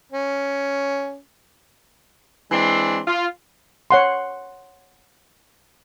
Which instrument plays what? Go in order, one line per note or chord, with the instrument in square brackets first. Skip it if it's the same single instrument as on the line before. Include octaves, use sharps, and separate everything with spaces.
[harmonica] C#4
[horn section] E3 G#3 C4 D4 C6
F4
[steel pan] C#5 F#5 C6